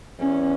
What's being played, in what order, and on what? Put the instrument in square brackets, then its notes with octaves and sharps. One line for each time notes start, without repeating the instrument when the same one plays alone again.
[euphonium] E2 [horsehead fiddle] C#4